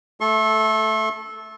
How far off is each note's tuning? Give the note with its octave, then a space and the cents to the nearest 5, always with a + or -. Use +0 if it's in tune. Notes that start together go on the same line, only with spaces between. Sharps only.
A3 +0 A4 -15 C#6 -45